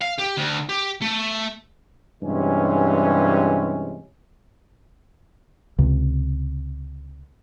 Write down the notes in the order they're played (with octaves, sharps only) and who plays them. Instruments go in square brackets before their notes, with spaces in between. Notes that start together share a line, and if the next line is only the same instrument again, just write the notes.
[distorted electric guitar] F5
G4
D2
G4
A3
[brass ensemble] G2 C3 E3 G#3 C#4
[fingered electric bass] C#2 C3